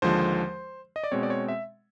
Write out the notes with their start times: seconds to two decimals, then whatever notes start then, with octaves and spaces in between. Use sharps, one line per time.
0.02 D#2 D3 F3 G#3 C5
0.96 D#5
1.04 D5
1.12 B2 G#3 C4 C#5
1.23 D5
1.30 C#5
1.48 E5